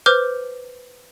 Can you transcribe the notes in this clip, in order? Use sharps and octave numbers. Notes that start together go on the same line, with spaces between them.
B4 C5 D6 F6 G6